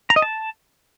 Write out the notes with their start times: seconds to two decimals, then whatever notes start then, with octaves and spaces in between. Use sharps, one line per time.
0.10 A#5
0.16 D#5
0.22 A5